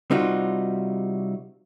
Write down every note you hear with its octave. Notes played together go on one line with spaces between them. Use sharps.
C3 G3 D#4 F4 F#4